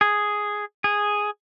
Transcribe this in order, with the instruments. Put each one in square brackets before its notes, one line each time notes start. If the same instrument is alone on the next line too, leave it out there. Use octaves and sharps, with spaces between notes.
[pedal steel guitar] G#4
G#4